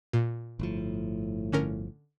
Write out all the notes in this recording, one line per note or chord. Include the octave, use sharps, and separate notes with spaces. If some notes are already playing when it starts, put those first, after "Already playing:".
A#2
G1 A2 F3
D3 C#4 A#4